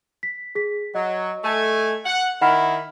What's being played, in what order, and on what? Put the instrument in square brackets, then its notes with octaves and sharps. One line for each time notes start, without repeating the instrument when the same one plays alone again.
[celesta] B6
G#4 B6
[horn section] F#3 [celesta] D#5
[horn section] A3 G#5
F#5
[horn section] D#3 E4 [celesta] F#5 B5 F6